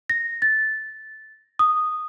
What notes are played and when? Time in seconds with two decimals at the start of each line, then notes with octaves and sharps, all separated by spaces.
0.10 A#6
0.42 A6
1.59 D#6